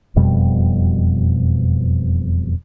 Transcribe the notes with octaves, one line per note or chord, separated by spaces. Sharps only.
E1 F2 B2 G3